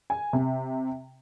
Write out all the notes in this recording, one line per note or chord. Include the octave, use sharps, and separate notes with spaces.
G#5
C3